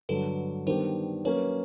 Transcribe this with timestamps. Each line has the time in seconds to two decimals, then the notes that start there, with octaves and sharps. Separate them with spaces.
0.09 G2 D3 F#3 A4 B4
0.67 D#3 G3 B3 D4 G4 A#4 C5
1.25 F#3 A#3 C#4 B4 C#5